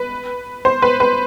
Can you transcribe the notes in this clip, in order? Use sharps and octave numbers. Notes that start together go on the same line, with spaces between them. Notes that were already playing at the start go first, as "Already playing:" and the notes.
Already playing: B4
C5
B4
B4